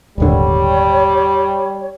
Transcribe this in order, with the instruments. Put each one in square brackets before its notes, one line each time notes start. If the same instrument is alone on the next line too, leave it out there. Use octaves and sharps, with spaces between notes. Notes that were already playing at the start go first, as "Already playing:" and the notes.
[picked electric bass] D#1 G#1 D3 [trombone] G3 [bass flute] C#5